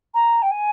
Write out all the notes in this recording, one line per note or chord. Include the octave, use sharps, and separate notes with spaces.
A#5
G5
G#5